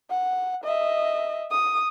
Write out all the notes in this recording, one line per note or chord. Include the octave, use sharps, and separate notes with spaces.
F#5
D#5 E5
D#6